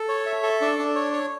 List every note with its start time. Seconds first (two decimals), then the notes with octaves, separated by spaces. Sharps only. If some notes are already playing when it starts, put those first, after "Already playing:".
Already playing: A4
0.09 C#5
0.26 E5
0.43 A4
0.61 D4
0.79 D4
0.95 C#5
1.13 C#5